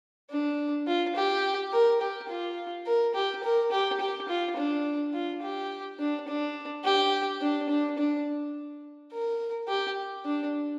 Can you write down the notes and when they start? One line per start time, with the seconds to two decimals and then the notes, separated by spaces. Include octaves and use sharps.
0.30 D4
0.87 F4
1.16 G4
1.73 A#4
2.01 G4
2.29 F4
2.86 A#4
3.14 G4
3.43 A#4
3.72 G4
4.00 G4
4.29 F4
4.57 D4
5.14 F4
5.42 G4
5.99 D4
6.27 D4
6.84 G4
7.41 D4
7.69 D4
7.98 D4
9.12 A#4
9.68 G4
10.25 D4